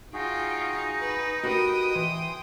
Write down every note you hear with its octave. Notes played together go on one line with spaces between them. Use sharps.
D#4 F4 F#4 G#4 G5
B4
F#4 G4 A#4 B4 D#5 G5 D#6
E3 C6